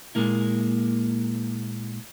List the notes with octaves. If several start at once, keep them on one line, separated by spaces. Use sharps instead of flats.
A#2 G#3 A#3 E4